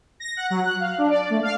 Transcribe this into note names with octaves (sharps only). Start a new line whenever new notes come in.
A#6
F#5
F#3
F#6
F5
D4
D5
A3
F5